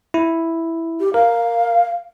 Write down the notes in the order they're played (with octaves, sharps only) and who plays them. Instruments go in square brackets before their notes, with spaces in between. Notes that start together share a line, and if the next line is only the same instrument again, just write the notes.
[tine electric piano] E4
[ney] G4
[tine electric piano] A#4 [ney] F5